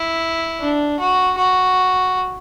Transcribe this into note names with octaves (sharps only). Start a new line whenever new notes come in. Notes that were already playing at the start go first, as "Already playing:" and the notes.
Already playing: E4
D4
F#4
F#4